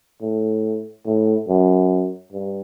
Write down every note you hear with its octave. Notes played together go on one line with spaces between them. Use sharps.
A2
A2
F#2
G2